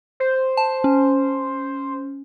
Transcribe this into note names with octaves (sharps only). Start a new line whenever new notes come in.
C5
A5
C#4